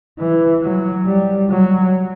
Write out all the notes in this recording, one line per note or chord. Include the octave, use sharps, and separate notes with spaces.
E3
F#3
G3
F#3